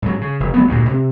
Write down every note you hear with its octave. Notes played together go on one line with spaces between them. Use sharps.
G#2 F#3
C#3
F1
F#3 G3 B3
D2 G2 A#2
C3